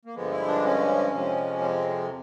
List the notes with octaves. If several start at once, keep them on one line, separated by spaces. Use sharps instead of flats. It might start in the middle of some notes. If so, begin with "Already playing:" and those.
A#3
G2 D3 F3 G#3 B3
E4
D4
C#4
F2 C3 F3 G#3
C4